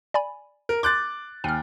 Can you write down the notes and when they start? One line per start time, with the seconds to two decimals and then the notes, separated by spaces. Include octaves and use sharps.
0.14 D5 G#5 B5
0.69 A#4
0.83 C6 D6 F#6 G6 A6
1.44 D#2 G#5 F6